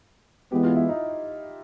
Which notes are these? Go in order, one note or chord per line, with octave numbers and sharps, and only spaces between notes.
E3 G#3 B3 G4
F4
E4
D#4